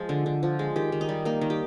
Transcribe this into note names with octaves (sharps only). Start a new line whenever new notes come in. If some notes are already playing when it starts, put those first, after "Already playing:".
Already playing: F3 G#3
D3
D3
F3
G#3
D#3 G4
D#3
D#4
G3
A#3 D#4
D#3
G4